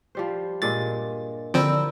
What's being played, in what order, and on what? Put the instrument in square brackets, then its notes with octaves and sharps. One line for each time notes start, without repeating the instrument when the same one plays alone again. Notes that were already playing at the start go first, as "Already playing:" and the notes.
[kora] F3 G3 C5
[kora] G2 A#2 G#3 [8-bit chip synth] A6
[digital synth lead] D3 [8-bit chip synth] F3 C4 [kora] E4 A#4 [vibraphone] D5 B5 E6